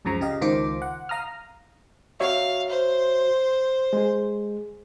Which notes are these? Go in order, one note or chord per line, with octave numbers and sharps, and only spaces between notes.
C#2 F#2 C#3 F3 A#5
C#3 G4 D#5 F5
C#2 D#3 F4 C5 D6
F#5
F5 A#5 D#6 F6
F#4 C#5 E5 F5
C5
G#3 G#4